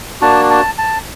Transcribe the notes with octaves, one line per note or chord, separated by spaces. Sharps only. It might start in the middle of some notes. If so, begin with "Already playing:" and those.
A#3 D4 F#4 A5
A5
A5